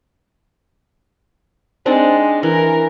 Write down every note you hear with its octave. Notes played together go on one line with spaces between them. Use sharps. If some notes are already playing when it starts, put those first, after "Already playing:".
G#3 C4 D4 D#4
E3 A#4